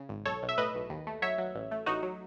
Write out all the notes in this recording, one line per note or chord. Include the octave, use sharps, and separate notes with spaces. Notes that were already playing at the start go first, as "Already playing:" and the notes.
Already playing: C#3
G#1
B1 A4 C#5
B1
E5
A2 B4 D#5
B1
D#2
A3
F#3 C#5 E5
F#3
A1
A3
A1 D#4 F#4
F#3